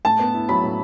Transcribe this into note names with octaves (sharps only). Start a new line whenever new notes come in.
A2 A5
B3
E4
F#3 B5
A2